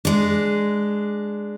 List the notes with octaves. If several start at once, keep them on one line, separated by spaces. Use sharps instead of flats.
G#3 D4